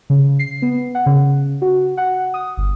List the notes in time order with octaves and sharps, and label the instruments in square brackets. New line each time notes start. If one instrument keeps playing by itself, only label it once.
[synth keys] C#3
C7
B3
F#5
C#3
F#4
F#5
D#6
G1